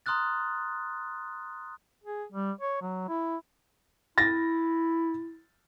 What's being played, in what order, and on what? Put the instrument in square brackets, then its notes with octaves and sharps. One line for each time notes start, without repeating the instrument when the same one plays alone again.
[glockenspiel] A#5 C6 D#6 F6 F#6 A6
[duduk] G#4
G3
C#5
F#3
E4
[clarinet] E4 [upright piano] A6 A#6